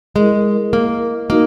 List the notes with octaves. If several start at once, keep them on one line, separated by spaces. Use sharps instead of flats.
G#3 E4 A#4 D#5
A#3
A#3 D#4 F#4 A#4 D#5